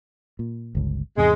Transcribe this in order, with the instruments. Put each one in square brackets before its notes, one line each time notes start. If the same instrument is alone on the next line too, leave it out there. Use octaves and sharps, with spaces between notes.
[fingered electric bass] A#2
G1 C#2
[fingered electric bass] E2 G#2 C3 [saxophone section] G#3